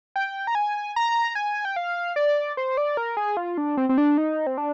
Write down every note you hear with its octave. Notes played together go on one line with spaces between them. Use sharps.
G5
A#5
G#5
A#5
G#5
G5
F5
D5
C5
D5
A#4
G#4
F4
D4
C4
C4
D4
D#4
C4
D4